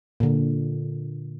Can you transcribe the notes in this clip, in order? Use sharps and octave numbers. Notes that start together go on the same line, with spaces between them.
A#2 D3